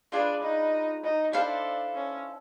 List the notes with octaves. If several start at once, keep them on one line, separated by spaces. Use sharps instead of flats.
D4 F4 G#4 B4
D#4
D#4
D4 E4 A4 C5 F5
C#4